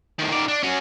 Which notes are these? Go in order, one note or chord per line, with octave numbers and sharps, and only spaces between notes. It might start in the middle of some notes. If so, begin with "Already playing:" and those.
A2 D#3
D#3 D5
D4
C#4 F#4